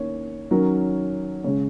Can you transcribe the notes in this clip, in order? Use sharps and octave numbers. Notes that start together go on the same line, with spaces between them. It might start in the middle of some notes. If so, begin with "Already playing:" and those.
Already playing: D#3 A#3 C#4 C#5
D#3 F#3 C#4 A#4
C#3 G#3 C#4 C#5